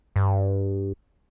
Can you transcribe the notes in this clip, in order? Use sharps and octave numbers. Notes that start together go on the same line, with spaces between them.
G2